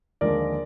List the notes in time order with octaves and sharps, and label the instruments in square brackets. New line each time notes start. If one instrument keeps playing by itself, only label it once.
[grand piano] D#2 D3 F3 G#3 A#4 D5